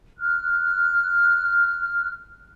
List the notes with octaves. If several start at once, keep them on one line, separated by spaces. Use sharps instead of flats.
F6 F#6